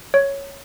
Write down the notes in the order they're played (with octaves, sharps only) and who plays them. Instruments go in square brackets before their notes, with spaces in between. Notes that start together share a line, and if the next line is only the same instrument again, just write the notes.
[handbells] C#5